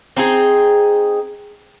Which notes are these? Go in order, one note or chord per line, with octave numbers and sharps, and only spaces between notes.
C4 D#4 G#4